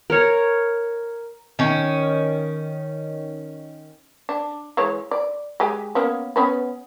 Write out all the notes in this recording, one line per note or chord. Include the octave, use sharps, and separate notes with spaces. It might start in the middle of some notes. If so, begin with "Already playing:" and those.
A#4 C#5
D#3 C#4
D4
E3 G#3 C#5
D5
G#3 G4 G#5
A#3 B3 C#4
B3 C#4 B4